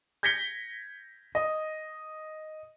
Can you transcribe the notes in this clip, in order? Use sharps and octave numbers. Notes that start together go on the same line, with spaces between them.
G6 G#6 A#6 B6 C#7 G7
D#5